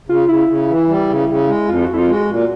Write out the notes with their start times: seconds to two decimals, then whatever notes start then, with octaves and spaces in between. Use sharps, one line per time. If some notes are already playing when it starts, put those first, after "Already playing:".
0.08 C#3 F4
0.28 C#3 E4
0.49 C#3
0.69 E3
0.89 G3
1.09 C#3
1.29 C#3
1.48 G#3
1.68 F2 F4
1.84 F2 F#4
1.94 E4
1.99 F4
2.08 G#3
2.13 F#4
2.29 A#2